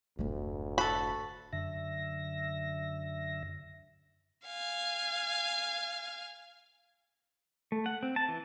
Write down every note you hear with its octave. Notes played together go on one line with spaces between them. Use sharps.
F1 D2 G#2
F#4 A4 B5
F#2 D3 E5 A#6
F5 G#5
A3
F#5
C4
A5
E3